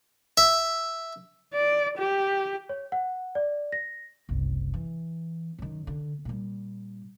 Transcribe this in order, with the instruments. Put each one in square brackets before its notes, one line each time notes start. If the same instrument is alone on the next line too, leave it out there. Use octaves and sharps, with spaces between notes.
[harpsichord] E5
[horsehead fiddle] D5
G4
[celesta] C#5
F#5
D5
A#6
[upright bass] F#1 C2
E3
F#2 D#3
D3
A#2 G3